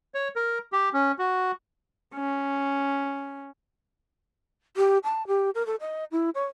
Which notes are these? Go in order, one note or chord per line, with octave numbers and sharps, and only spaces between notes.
C#5
A#4
G4
C#4
F#4
C#4
G4
A5
G4
A#4
A4
D#5
E4
C#5